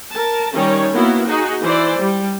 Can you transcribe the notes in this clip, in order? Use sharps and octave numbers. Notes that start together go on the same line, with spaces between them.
A#4 A5
D#3 G3 C#4 C#5
A#3 B3 E4 F#4
D#4 F#4 G#4
E3 E4 C5 D5
G3